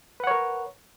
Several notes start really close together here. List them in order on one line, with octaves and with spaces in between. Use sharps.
B4 F#5 C#5 A#4